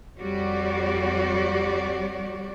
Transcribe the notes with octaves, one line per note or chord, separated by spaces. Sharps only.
F2 G3 F#4 G4 C#5 D5